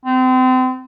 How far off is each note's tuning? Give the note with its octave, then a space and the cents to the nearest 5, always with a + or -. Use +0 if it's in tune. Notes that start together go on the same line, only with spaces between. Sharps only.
C4 -35